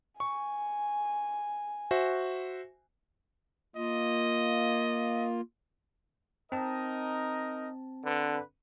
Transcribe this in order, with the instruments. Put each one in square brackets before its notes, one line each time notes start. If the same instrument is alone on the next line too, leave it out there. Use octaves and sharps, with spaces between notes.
[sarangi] G#5 [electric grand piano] C#6
[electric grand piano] F#4 C5 E5
[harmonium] A#3 F4 [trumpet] D#5
[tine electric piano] C4 A5 [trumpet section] D#4 A#4 D#5
[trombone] D3 [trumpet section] B4